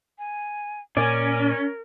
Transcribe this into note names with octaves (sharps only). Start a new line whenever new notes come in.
G#5
A#2 C#4 A#4 D5 G#5